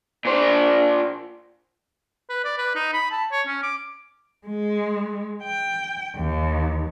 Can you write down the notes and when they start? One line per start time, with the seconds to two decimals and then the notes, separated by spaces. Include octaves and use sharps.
0.25 A#2 C5 D5
2.29 B4
2.45 D5
2.58 B4
2.75 D#4
2.93 B5
3.11 A5
3.32 C#5
3.47 C#4
3.63 D6
4.47 G#3
5.43 G5
6.17 D#2